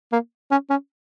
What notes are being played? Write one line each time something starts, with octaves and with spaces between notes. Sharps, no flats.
A#3
C#4
C#4